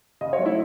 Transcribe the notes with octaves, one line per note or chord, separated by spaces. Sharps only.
C#3 D#5
C#5
F#3 A3
E4